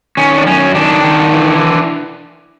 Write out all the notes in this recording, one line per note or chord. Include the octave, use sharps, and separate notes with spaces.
D#3 C#4
D4
F#2 C#4
D#3 D4
D#3
E3